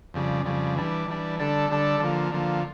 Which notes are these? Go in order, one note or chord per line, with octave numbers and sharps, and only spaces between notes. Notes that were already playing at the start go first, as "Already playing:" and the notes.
F2 C#3 G3
F2 C#3 G3
E3 G3 D4
E3 G3 D4
D3 G3 D4 A4
D3 G3 D4 A4
D3 F3 A#3
D3 F3 A#3